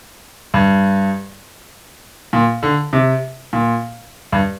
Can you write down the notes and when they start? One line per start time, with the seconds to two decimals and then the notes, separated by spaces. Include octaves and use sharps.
0.54 G2
2.33 A#2
2.63 D3
2.93 C3
3.53 A#2
4.33 G2